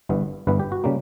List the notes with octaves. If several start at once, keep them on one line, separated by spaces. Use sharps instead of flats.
G1 G2 E3 B3
G1 G2 E3 B3 B4
G4
F#4
C#3 G3 A#3